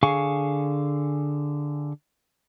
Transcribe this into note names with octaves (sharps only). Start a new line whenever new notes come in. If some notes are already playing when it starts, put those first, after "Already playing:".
D3 G#4 F5 G#5 C#6